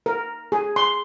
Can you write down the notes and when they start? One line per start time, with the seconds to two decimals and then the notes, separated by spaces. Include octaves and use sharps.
0.06 A#4
0.52 G#4
0.76 C6